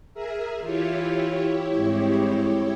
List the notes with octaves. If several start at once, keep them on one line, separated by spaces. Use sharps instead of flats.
G#4 A#4 E5
E3 E4 F4 G4 C#5
G#2 G3 C4